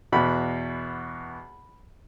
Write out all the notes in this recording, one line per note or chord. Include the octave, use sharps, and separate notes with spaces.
E2 B2 B5